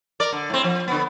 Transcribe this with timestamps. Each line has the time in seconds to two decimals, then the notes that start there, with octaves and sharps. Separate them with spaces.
0.20 A#4 D5
0.32 D3
0.50 A2 C4
0.64 F3
0.88 D3 B3